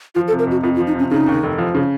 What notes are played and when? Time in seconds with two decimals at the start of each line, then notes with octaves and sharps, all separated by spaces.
0.15 F3 F4
0.28 A4
0.32 C3
0.39 A#4
0.47 F2 F#4
0.63 F2 F4
0.76 F4
0.80 F3
0.87 D#4
0.95 C3 C#4
1.11 C#3 D#4
1.28 D#2
1.43 F1
1.58 F3
1.75 C#3